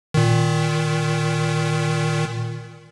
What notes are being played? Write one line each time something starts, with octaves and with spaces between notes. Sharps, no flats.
A#2 D#3